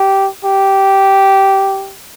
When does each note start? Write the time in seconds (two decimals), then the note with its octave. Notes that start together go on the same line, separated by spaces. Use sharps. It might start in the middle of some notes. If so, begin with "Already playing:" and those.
Already playing: G4
0.45 G4